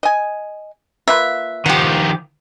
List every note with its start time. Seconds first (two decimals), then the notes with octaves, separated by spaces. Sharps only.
0.03 D#5 G#5
1.08 A#3 F4 B4 E5
1.66 D#3 F3 G4 F#5